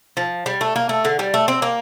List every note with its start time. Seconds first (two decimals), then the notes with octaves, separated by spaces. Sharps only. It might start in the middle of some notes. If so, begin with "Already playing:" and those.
0.17 F3
0.46 G3
0.61 A3
0.76 A#3
0.89 A3
1.05 D3
1.19 G3
1.34 A3
1.48 C4
1.62 A#3